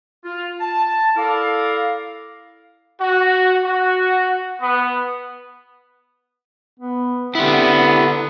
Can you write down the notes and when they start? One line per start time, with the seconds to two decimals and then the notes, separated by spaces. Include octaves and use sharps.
0.24 F4
0.60 A5
1.16 E4 A4 A#4 D5 F5
3.00 F#4
3.62 F#4
4.61 B3
6.80 B3
7.35 D3 B3 E4 G4